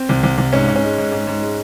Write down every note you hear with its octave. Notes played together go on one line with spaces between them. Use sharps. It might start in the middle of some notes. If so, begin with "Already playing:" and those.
Already playing: C4
C2
C2
C2
G#2 C#4
G#2
C#4
G#3
G#2
G#2
G#2
G#3